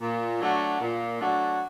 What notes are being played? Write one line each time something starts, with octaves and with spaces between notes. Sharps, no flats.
A#2
F#3 A3 D4 F#4
A#2
F#3 A3 D4 F#4